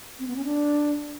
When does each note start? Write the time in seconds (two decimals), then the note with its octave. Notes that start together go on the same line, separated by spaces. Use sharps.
0.19 C4
0.28 B3
0.36 C#4
0.44 D4